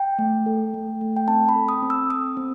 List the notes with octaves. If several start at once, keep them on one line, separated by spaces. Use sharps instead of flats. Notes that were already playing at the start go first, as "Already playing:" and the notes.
Already playing: G5
A3
A4
A3
A3
G5
C4 A5
B5
A4
D#6
C4
E6
C4 D#6
C4